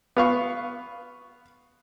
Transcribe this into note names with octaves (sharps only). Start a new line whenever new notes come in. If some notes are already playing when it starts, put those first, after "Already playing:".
B3 F5 C#6